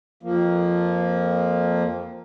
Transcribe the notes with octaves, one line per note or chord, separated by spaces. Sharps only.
F2 F3 A#3